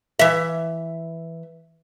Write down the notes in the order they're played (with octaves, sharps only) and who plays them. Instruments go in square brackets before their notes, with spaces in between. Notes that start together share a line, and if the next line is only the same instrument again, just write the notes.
[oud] E3 E5